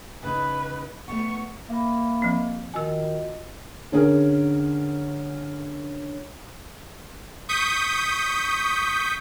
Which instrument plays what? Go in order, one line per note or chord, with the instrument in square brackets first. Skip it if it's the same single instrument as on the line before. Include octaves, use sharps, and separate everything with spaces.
[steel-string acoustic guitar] C#3 D#4 [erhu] B4
[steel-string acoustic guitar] A3 B3 F#5 [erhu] C#6
[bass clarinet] A#3 [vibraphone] E5 B5
[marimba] F3 C4
[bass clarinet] D#3 [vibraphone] F4 F#4 D#5 [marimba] G#5 E6
[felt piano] D3 C#4 G#4 A#4
[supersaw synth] C#6 D#6 G6 B6